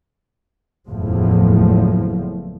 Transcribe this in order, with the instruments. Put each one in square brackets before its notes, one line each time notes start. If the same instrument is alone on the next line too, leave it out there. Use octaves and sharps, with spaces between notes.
[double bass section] F#1 E2 A2 F3